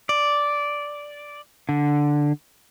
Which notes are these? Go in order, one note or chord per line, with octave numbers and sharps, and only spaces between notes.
D5
D3